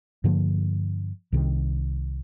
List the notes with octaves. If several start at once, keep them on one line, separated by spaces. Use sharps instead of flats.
G2 D3 F3 A#3
C2 C3 D#3